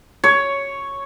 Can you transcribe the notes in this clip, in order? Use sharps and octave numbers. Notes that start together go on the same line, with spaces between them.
C#5